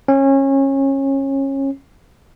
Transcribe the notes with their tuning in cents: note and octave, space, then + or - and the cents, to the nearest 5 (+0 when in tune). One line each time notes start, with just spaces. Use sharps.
C#4 -25